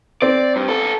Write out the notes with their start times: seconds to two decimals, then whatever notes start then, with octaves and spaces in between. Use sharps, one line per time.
0.22 C4 D5
0.56 G2
0.68 B3 A4